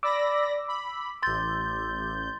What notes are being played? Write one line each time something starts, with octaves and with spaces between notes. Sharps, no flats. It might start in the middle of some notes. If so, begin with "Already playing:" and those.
D5 B5 D6 E6 A#6
B5
A1 C6 G6 A6